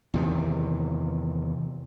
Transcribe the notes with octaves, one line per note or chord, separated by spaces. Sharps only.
E2 C3 D#3